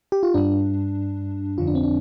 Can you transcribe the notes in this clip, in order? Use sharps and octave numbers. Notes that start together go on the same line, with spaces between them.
G4
F4
G2 G3 D4
F2 D3 F3 F4
D4
C4
D4